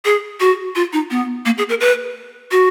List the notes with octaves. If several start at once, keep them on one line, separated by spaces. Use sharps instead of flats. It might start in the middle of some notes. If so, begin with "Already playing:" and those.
G#4
F#4
F4
D#4
B3
A#3
G#4
A#4
B4
F#4